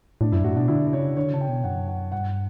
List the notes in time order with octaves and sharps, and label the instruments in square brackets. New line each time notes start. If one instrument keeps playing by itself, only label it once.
[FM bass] A2 [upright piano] D4
[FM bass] F#2 [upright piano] E4
[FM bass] A2 [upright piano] F#4
[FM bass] B2 [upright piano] D4
[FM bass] D3 [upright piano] E4
[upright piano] D5
[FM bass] C#3 [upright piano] C#5
[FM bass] D3 [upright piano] C#5
[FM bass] C#3 [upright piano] A5
[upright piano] G5
[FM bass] B2
[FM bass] F#2 [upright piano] F#5
[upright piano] F#5
[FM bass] G2 [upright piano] F#5